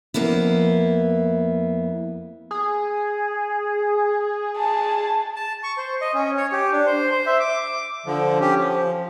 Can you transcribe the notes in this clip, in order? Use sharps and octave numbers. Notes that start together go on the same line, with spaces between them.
F2 A#3 B3 E4
G#4
A5
A5
C#6
C5
D#5
C#4
C#5
G4
D4
C5
C5
E5
D6
D3 F3
C#4 G4
F3